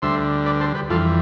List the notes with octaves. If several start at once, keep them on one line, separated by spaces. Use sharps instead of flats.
D2 D3 G3 C5 E5
B4 D5
A4 C5
G4 B4
F2 E3 G3 F4 A4